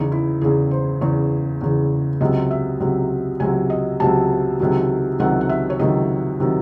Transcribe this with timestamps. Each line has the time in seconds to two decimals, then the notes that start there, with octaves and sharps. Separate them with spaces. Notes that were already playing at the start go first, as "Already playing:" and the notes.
Already playing: E2 C#3 E3 D#4
0.12 E4
0.41 E2 C#3 E3 G#4
0.71 C5
1.01 E2 C#3 E3 C#5
1.61 E2 C#3 E3
2.20 C#2 C3 F#3 D#5
2.51 E5
2.80 C#2 C3 F#3
3.40 C#2 C3 F#3 G#5
3.70 D#5
4.00 C#2 C3 F#3 A5
4.60 C#2 C3 D#3 F#3
5.19 C#2 C3 D#3 F#3 F#5
5.41 F#5
5.49 E5
5.70 C#5
5.79 C#2 C3 D#3 F#3 D#5
6.40 C3 D#3 F#3